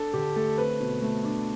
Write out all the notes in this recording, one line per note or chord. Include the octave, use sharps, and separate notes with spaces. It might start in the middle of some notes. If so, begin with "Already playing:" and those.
Already playing: D4 A4
D3 G4
A3 A4
C4 B4
B2
A3
D4